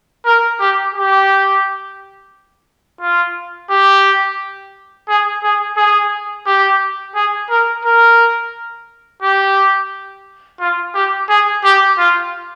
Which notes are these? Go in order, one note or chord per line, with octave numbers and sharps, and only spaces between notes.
A#4
G4
G4
F4
G4
G#4
G#4
G#4
G4
G#4
A#4
A#4
G4
F4
G4
G#4
G4
F4